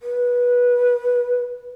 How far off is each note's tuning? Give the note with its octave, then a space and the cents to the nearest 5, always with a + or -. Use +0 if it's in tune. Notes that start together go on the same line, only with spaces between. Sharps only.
B4 -20